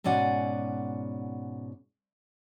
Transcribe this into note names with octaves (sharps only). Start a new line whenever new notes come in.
G#2 B2 C#4 D5 F#5 G#5